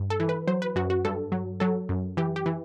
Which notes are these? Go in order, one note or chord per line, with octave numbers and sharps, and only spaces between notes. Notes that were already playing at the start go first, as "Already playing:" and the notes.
Already playing: G2
A4
E3
B4
F#3 C5
B4
F#2 F#4
F#4
G2 A4
F#3
F#3 A4
F#2
E3 G4
G4
E3